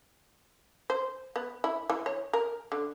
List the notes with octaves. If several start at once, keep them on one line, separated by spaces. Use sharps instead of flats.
C5
B3
E4
E3
C#5
A#4
D3